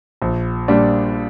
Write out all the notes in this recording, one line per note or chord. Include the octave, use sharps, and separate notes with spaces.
A#1
A#2 G3 D4